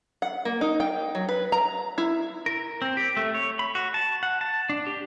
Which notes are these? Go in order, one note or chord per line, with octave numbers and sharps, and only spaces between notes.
F#5
A#3
D#4
G5
F#3
B4
A#5
E4
A#4
C4
G4
A3
C#5
B5
F#4
A5
F#5
A5
D4
G4